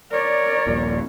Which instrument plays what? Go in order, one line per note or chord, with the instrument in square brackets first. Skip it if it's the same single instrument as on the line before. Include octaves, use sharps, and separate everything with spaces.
[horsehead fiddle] A#4 C#5 [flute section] D5
[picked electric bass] D#1 A#1 A#2